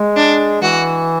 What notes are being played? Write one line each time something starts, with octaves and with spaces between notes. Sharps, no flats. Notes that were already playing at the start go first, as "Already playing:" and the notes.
Already playing: G#3
D4
E3 F#4